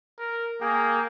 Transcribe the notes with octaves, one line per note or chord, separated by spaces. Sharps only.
A#4
A#3 G#4 G5 A#5